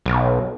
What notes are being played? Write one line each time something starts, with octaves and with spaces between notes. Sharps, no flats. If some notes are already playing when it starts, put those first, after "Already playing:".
B1